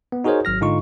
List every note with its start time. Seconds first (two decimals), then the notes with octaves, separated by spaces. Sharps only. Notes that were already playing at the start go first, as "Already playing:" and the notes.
0.12 B3
0.24 D#4 F#4 G#4 A#4 C5 C#5
0.45 G#1 F#3 F6 A#6
0.61 G#2 D3 D#4 F4 C#6